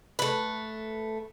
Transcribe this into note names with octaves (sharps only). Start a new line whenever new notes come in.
A3 B4